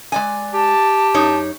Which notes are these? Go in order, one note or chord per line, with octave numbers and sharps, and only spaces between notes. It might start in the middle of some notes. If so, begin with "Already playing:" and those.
G#3 D5 G#5
G4 A5
F#2 D#4 C#5